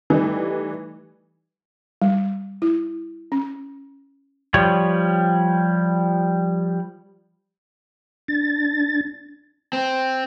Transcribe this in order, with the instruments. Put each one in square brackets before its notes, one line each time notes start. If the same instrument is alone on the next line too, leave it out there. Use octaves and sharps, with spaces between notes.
[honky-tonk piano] E3 G3 A3 D#4 G4 B4
[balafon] G3
E4
C#4
[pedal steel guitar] F3 G3 C#5
[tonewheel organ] D4 A6
[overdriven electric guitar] C4